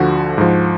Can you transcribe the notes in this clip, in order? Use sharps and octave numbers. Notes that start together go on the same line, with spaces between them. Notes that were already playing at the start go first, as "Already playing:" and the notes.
Already playing: D2 D3 F3 F#4
G#2 F3